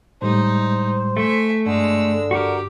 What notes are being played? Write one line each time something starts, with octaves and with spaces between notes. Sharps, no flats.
A2 G3 G#3 D#4 C5
A3 E5 G#5
G2 D3 G#3 E6
F#4 G4 A#4